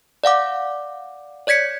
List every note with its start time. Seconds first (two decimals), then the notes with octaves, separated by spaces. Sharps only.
0.24 D5 F5 F#5 D6
1.47 C#5 D5 G#6 B6 C#7